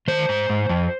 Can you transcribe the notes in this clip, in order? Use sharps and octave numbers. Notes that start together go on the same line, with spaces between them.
D#3 C5
G#2
G#2
F2